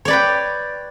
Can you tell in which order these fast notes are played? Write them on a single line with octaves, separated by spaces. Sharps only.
C#5 D5 B4 G5